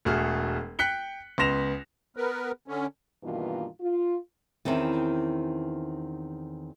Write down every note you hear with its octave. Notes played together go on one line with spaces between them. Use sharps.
E1 A3 F#4 G#4 F6
G5 F#6 B6 C#7 G7
C#2 B3 C6 A#6 E7 F7
B3 A#4 B4
D3 C#4
G2 B2 D#3 E3 A#3 F4
F4
E2 D#3 C4 C#4 E4 D#5